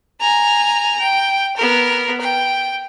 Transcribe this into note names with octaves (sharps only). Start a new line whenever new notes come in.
G#5 A#5
G5
B3 A#4
G5